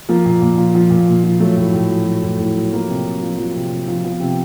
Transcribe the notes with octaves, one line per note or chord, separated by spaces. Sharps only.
F3 A#3
A#2
A#2
F3
F3
A#2
A#2
F3
F#3 A3
A2
A2
F#3
F#3
A2
A2
F#3
F3 A#3
C3
C3
F3
F3
C3
C3
F3
F3 B3
C3